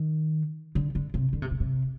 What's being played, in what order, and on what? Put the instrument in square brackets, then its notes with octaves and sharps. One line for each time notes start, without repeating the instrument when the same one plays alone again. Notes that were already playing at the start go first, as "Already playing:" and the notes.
Already playing: [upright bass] D#3
D3
D3
C3
D3
C3
A#2
C3